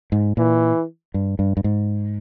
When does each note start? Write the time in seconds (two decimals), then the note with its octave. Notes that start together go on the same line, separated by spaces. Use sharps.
0.12 G#2
0.37 A#2 E3
1.14 G2
1.39 G2
1.57 G2
1.64 G#2